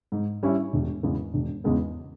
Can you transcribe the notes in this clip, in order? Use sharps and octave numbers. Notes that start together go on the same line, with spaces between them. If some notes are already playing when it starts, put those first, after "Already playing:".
G#2
G3 C#4 E4
E1
E2 C#3 G#3 B3
E1
E2 C#3 G#3 B3